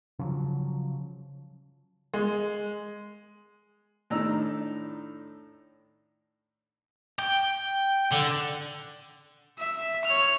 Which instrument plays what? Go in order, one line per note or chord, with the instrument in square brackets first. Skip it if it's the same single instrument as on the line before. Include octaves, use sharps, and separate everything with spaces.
[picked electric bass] C#3 F3 F#3
[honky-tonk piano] G#3
[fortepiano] A2 D#3 D4 A#5 E6
[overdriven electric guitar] G5
D3
[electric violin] E5
C#5 F6